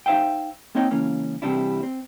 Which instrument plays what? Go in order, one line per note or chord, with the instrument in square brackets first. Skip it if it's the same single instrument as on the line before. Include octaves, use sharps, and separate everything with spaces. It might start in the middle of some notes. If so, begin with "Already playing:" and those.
[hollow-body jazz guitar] D#4 C5 E5 F5 G5
A#3 C4 D#4 C#5 D#5 G5
C#2 E3 A#3 C#4
C3 E3 G3 D4 E4
C4